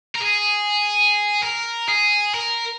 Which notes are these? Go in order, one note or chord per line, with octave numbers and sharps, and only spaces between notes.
A#4
G#4
A#4
G#4
A#4